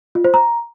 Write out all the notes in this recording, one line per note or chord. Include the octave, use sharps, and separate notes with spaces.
F4
C5
A#5